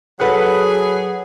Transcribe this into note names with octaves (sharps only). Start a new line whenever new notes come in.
F#3 G#4 A4 B4 F#5